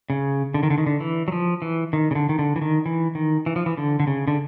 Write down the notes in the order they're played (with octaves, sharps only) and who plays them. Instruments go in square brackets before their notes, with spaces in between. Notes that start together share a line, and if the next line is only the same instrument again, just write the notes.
[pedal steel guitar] C#3
D3
D#3
D3
D#3
D3
E3
F#3
F3
E3
D#3
C#3
D3
D#3
D3
E3
D#3
E3
D#3
E3
F3
E3
D3
D3
C#3
D3